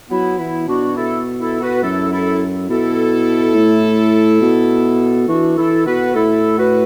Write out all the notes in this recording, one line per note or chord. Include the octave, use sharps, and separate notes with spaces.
F#3 B3 E4
E3 B3 E4
B2 D4 F#4
E4 A4
E4 A4
F#4 B4
F#2 E4 A4
E4 A4
B2 E4 A4
A2
B2
E3 D4 F#4
E3 E4 A4
B2 F#4 B4
A2 E4 A4
F#4 B4